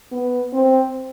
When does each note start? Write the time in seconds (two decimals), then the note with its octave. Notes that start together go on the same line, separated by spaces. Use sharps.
0.12 B3
0.53 C4